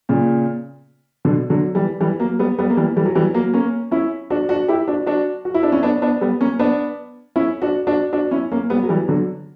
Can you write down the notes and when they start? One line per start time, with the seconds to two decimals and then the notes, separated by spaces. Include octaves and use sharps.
0.09 A#2 C#3
1.25 B2 D3
1.50 D3 F#3
1.75 E3 G3
2.00 E3 G3
2.20 F#3 A#3
2.39 G3 B3
2.59 G3 B3
2.70 A#3
2.77 E3 G3
2.96 E3 G3
3.05 F#3
3.15 E3 G3
3.34 F#3 A#3
3.54 A#3 C#4
3.91 C#4 E4
4.30 D4 F#4
4.49 D4 F#4
4.68 E4 G4
4.88 D4 F#4
5.06 D4 F#4
5.45 F#4
5.54 E4
5.63 D4
5.72 C#4 E4
5.83 B3 D4
6.02 B3 D4
6.21 G3 B3
6.41 A#3 C#4
6.59 B3 D4
7.36 C#4 E4
7.62 D4 F#4
7.87 D4 F#4
8.13 D4 F#4
8.31 C#4 E4
8.52 A#3 C#4
8.70 G3 B3
8.83 F#3
8.89 E3 G3
9.08 D3 F#3